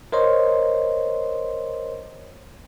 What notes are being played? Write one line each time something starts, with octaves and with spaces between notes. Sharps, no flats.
A#4 C5 C#5 D#5 C6